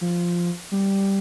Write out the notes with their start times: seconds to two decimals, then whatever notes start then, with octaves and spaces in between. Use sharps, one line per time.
0.01 F3
0.72 G3